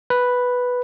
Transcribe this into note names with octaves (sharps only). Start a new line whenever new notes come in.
B4